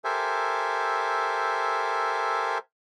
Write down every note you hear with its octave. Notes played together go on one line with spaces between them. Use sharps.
G4 A4 A#4 C5 E5 G#5